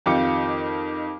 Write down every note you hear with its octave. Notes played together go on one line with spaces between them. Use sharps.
F2 D#3 F4 G4 D6 C#7